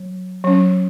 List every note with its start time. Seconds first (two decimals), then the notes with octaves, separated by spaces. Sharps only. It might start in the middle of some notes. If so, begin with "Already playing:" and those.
Already playing: F#3
0.44 F#3 C#4